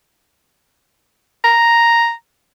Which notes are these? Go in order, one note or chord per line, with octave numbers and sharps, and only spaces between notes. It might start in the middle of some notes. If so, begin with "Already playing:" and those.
A#5